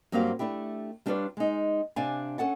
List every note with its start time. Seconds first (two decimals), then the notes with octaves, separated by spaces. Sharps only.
0.12 G2 F#3 A#3 C4 G4 F5
0.39 A3 D4 E4 G4
1.06 G3 D4 F4 B4 C#5 D5
1.37 G#3 D#4
1.96 C3 D4 D5 F5 G#5 A5
2.38 C#4 A4 F#5 A5